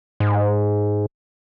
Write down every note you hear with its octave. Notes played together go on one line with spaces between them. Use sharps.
G#2